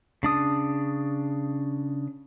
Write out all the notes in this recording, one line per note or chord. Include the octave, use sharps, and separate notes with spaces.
C#3 D4 D#6